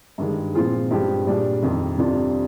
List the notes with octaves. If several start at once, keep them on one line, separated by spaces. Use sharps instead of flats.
G2 D#3 G#3
A#2 F3 C4 F4 G#4
G2 F3 G#3 C4 G4
A#2 G3 D4 G#4
F2 C3 D#3
F2 C3 G3 D4 F4